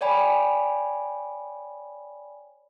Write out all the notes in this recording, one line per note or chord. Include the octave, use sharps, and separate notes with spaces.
C#5 D5 G5 G#5 B5